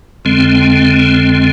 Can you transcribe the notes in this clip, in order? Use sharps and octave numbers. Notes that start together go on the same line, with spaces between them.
F2 D3 G#3 C4